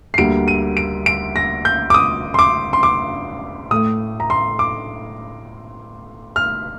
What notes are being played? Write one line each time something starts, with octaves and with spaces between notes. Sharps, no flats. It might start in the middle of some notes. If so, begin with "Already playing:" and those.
C7
D2 D3 G3 A#3 D7
D#7
D7
D7
A#6
G6
D6
D#6
C6
D6
C6
D6
A2 A3 D#6
A#5
C6
D6
F6